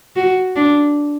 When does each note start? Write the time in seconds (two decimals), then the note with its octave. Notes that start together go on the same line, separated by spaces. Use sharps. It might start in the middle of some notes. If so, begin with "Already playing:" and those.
0.16 F#4
0.56 D4